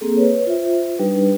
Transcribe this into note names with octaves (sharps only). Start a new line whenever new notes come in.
A#3 C4 G#4 A4
B4 C#5
F4 C5 E5
G3 D4 D#4 G4 B4